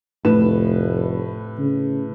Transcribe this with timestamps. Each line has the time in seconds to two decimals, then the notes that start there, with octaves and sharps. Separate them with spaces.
0.25 F1 A2 B4 E7
1.59 C#3